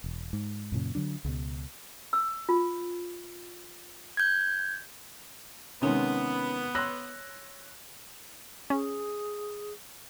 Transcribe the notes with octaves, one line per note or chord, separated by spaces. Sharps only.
E1
G#2
F#2 A#2 C#3
D3 F#3 D4
C#2 B2
E6
F4
G6 G#6
C3 D#3 G#3 B3 C#4
C#5 C6 E6 F#6 A#6
C#4 G#4